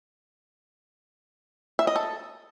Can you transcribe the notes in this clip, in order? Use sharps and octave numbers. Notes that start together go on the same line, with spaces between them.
E5
D#5
A4